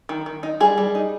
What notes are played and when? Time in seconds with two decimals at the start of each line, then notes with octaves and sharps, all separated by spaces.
0.09 D#3
0.26 D#3
0.43 D#4
0.60 G3 G#4
0.78 G3
0.95 D#4